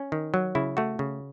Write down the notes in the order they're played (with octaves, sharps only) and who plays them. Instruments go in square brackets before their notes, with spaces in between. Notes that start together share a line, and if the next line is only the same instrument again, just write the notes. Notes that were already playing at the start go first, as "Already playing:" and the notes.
Already playing: [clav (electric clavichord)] C#4
D#3
F#3
C#3 E4
A3 F#4
C#3